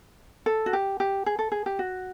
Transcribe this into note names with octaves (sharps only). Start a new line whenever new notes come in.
A4
F#4
G4
G4
G#4
A4
G#4
G4
F#4